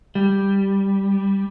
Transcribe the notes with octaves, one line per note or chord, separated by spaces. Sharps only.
G3